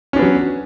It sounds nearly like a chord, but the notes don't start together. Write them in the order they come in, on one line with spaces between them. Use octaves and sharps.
C#4 D4 B3 F#3